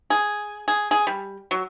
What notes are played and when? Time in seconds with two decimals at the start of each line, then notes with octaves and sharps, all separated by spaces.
0.10 G#4
0.68 G#4
0.91 G#4
1.07 G3
1.51 F#3